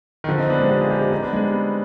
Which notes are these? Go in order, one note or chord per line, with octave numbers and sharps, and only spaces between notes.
D#3
D3 F3
C4 D#4
B3 D4
G#3 C4
D#4 G4
F4 G#4
D#4 G4
D#4 G4
C4 D#4
B3 D4
G#3 C4
G3 B3